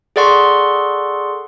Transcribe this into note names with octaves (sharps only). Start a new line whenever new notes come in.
G#4 A4 D5 F#5 C6 C#6